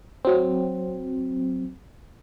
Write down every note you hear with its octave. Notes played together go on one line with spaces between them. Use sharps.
F#3 C4